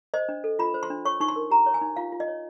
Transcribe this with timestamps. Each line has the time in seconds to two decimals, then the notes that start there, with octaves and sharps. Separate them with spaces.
0.14 C5 D#5
0.29 D4
0.44 A4
0.59 F4 B5
0.74 C5
0.83 C6
0.90 D4
1.05 C#5 C#6
1.20 D#4 C#6
1.28 C6
1.36 A#4
1.51 G4 A#5
1.66 C#5
1.74 G#5
1.81 D#4
1.96 F4 F5
2.12 F4
2.20 D#5
2.28 C#5